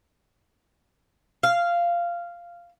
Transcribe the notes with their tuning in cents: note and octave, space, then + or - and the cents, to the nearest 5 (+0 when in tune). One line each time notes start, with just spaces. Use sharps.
F5 -10